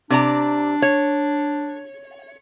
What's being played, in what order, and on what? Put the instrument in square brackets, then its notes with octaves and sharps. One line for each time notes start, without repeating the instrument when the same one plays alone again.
[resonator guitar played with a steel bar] C3 D5 A#5 [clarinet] D4
[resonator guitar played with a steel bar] C#5